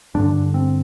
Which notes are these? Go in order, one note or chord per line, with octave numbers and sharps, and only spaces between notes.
G2 D3 D4
C4